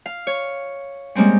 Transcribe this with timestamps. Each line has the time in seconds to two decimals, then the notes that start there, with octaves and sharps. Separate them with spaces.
0.06 F5
0.27 C#5
1.15 G3 G#3 A#3 C4 C#4